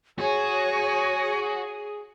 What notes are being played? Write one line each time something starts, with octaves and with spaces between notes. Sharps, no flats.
F#4 G#4 C#5 G#5